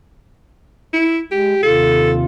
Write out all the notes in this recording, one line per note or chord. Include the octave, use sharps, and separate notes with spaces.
E4
G#3 G4
D#2 C3 F4 A4